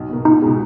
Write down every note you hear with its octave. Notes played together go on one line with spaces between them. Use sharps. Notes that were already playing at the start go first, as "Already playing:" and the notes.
Already playing: B1
B2 A#3
C#2 D#4
B2 G#3